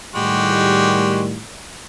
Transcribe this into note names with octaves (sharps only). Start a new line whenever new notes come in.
A2 D#3 G3 G#3 F#4 G4